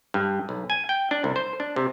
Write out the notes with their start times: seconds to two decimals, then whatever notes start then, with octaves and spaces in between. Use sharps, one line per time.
0.14 G2
0.49 B1
0.70 G#5
0.89 G5
1.11 D4
1.24 C2
1.36 C5
1.60 D4
1.76 C3